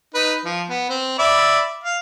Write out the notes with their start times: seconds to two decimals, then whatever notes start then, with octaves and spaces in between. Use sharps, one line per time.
0.15 D#4 B4
0.45 F3
0.70 B3
0.90 C4
1.19 D5 E5 B5
1.84 F5